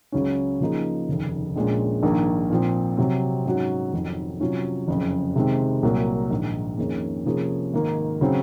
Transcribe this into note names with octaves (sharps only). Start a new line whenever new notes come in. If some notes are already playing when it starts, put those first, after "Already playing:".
C#2 C#3 F#3 C#4
C#3 F3 A#3 D#4 G#4
F1 D#2 C#3
A#1 A#2 G#3 C#4
A#1 G#2 D#3 A#3
A#2 F3 C4
C3 F#3 C4
G#2 F#3 C#4 F#4
F1 F2 D#3 F#3
C3 F#3 C#4 F4
F#1 F2 C#3
C3 D#3 G#3 C4
C2 A#2 F#3 A#3
A#1 G#2 D#3
F2 D#3 A#3 C#4 G#4
C3 F3 A#3 C#4 G#4
G#1 G#2 D#3 A#3
C#3 F#3 C4